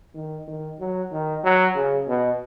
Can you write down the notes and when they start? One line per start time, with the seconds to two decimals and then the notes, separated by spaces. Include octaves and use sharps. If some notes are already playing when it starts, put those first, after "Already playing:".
0.15 D#3
0.48 D#3
0.80 F#3
1.12 D#3
1.44 F#3
1.75 C#3
2.08 B2